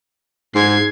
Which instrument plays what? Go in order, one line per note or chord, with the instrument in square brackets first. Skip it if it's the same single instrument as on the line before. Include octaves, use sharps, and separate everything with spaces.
[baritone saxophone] G#2 [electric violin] G#6 C7